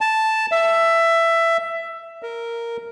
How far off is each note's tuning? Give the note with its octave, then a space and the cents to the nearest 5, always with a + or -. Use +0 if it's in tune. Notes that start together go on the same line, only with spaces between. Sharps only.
A5 +0
E5 +15
A#4 -5